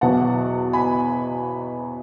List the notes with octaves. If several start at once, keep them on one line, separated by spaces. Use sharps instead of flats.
E2 B2 F#3 F#5 A5
G#5 B5